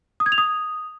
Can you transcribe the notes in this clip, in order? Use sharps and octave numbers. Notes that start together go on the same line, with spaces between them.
D#6
G#6
F7
D#6